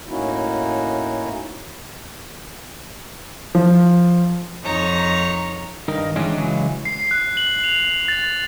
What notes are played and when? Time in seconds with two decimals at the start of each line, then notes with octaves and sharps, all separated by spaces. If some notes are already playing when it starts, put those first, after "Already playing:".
0.09 A2 A#3 C#4 D#4 E4 F#4
3.55 F3
4.62 F2 D#4 C#5 A#5
5.88 G2 D#3 D#4 A#4
6.16 D#3 E3 G#3 C#4 D4
6.38 C#3 E3 F#3 G#3
6.85 C7
7.11 F#6
7.37 F#7
7.64 F7
8.08 A6